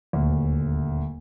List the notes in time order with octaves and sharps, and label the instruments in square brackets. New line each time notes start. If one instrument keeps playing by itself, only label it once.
[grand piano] D#1 D2